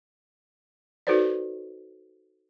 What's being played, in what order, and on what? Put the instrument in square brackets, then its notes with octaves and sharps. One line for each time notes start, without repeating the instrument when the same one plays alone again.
[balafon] D#4 F#4 A4 B4 C5 D5